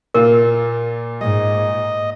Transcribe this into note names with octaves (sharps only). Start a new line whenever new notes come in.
A#2 F4 A#4
G#2 D#5